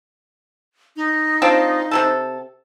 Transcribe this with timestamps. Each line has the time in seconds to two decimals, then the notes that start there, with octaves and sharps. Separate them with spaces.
0.96 D#4
1.42 C4 D4 F4
1.91 C3 F3 A4